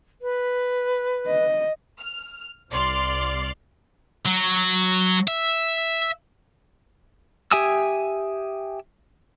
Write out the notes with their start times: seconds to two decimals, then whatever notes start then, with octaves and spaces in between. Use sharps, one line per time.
0.21 B4
1.27 D#5
2.00 F6
2.70 C2 D5 C6 F6
4.26 F#3
5.27 E5
7.51 G4 E5 G#5 D#6 E6